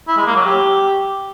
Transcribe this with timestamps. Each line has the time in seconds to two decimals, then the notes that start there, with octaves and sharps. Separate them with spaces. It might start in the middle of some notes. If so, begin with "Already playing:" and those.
0.08 E4
0.17 G#3
0.27 A#3
0.36 F#3
0.45 G4